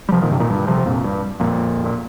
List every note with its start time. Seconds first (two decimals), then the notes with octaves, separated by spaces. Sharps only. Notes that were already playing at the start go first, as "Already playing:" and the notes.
0.09 G3
0.12 C3 F3
0.21 A#2 D#3
0.31 G2 C3
0.40 A#2 D#3
0.50 G2
0.67 C3 F3
0.86 F2 A#2
1.04 G2
1.40 F2 A#2
1.84 A#2